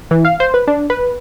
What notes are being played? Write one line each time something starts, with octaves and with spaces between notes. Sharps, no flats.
E3
F5
C5
B4
D4
B4